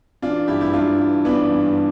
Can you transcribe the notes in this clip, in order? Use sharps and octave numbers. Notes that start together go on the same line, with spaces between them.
E3 D4 F4
G2 E4 G4
E4 G4
G2 D4 F4
E3
E3 B3 D4
G2